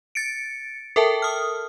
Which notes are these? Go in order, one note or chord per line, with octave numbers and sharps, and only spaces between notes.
A6 C#7 D7
A4 A#4 E5 G5 A5
D#6 F6